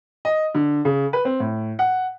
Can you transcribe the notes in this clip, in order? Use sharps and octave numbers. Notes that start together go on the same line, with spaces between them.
D#5
D3
C#3
B4
C4
A2
F#5